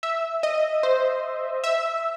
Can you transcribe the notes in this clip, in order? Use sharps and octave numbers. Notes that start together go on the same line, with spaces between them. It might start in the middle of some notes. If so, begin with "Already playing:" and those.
E5
D#5
C5
E5